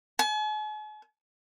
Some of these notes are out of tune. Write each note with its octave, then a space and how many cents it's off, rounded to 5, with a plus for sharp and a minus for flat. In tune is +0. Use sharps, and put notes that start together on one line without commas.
G#5 +45